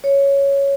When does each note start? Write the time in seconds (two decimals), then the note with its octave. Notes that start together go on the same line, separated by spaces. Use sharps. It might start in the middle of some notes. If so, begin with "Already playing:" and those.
0.04 C#5